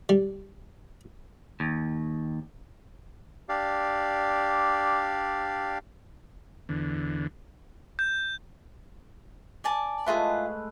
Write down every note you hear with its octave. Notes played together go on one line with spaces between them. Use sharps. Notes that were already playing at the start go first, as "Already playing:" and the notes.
G3
D#2
D4 G4 D5 F5
E2 D3
G6
D5 G#5 A5
G#3 A3 E4 F4 G#4 B4